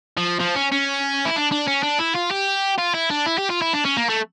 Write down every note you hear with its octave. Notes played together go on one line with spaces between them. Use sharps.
F3
F3
C#4
C#4
E4
D4
D4
C#4
D4
E4
F4
G4
F4
E4
D4
E4
G4
F4
E4
D4
C#4
A#3
A3